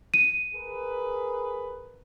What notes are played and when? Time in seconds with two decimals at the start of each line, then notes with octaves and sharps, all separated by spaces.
0.14 D#7
0.54 G#4 A#4 B4